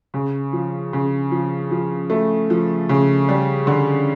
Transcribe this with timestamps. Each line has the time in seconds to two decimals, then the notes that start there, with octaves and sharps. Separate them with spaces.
0.14 C#3
0.53 F3
0.93 C#3
1.31 F3
1.71 F3
2.10 A3
2.50 F3
2.89 C#3
3.29 G3
3.67 D3